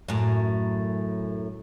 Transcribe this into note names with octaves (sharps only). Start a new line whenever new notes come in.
F#2 A2